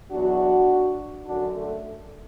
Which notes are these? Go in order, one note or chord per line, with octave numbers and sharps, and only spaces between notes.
E2 B2 F#3 D4 F#4
F#2 D3 F#3 D4 F#4
A3